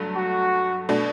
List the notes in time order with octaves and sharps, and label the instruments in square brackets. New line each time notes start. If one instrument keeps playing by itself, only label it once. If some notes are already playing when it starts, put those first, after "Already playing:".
Already playing: [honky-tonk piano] G2 F#3 A3
[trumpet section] F#4
[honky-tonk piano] B2 A3 D4